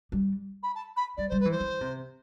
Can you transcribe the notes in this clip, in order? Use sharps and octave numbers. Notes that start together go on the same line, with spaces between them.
G3
B5
A5
B5
G3 D5
G3 C5
B4
E3
C5
E3
C3